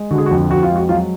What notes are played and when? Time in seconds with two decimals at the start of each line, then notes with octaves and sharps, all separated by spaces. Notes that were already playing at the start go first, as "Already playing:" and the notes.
Already playing: G#3
0.11 D3 F#4
0.18 G#4
0.26 F#4
0.31 F2
0.50 F2 F#4
0.63 F4
0.71 G#3
0.76 F#4
0.89 F#3 F4